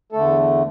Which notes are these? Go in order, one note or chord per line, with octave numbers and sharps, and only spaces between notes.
E2 D3 A3 A4